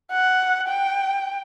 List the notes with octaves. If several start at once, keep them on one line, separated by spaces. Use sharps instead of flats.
F#5
G5